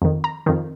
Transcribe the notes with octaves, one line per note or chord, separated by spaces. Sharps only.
F2 D#3
A#5
F2 D#3